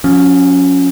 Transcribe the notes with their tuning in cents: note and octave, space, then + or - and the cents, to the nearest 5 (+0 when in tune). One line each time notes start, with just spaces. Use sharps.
F3 +45 C#4 +0